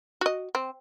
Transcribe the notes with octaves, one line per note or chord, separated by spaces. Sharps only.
F#4 D#5
C4